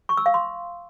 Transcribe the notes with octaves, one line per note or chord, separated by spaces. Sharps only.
C#6
E6
F5
C6